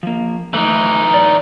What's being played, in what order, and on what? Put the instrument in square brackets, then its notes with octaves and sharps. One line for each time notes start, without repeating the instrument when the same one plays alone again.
[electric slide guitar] F3 A#3
[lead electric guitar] E3 D#4 [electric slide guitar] A3
[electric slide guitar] D5